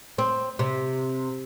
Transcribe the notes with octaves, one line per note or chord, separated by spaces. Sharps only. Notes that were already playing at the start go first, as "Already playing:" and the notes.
C4
C3